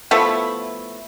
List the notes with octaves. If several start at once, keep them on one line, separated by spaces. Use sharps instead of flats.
F3 A3 B3 E4